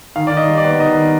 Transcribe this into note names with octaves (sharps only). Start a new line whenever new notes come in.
D#3 F5
D#3 D5
D#5
G3
D5
B3
D#3 D#5
D#3